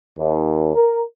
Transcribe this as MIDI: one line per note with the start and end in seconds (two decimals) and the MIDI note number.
0.18 0.74 39
0.76 1.01 70